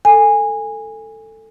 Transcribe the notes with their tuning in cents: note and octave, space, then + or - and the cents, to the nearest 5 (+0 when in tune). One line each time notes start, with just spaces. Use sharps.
A4 +10 G#5 -15